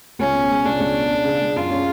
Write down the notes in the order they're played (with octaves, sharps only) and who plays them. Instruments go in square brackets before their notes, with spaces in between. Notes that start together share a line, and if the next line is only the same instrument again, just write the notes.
[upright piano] C#2 [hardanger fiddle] C#4
[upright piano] B2
G#3
[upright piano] C#2 [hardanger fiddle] D4
[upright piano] C#2
B2
C#4
C#3
G#3
[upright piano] F#2 [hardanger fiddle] F4
[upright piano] C#4